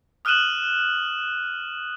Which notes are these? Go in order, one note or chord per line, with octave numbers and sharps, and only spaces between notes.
D#6 F6 F#6 D#7 E7 F#7